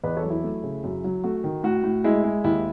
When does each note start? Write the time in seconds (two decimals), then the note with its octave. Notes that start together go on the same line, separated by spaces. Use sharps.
0.04 E2 B4 D#5
0.17 A4 C#5
0.23 F#3
0.30 E4
0.44 A3
0.63 C#3
0.84 F#2
1.04 F#3
1.24 A3 F#4
1.44 D#3
1.64 A2 F#4
1.84 A2
2.04 G#3 E4
2.24 G#3
2.44 D#2 E4